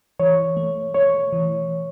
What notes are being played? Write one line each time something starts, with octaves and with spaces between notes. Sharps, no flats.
E3 C#5
A3
A3 C#5
E3